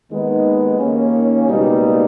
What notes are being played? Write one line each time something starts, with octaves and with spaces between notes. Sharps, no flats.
D#2 D#3 G#3 B3 D#4
D#2 D#3 A#3 C#4
C#2 B2 G3 A#3 D#4